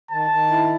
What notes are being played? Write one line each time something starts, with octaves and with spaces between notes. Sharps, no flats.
D#3 A5
D#3
E4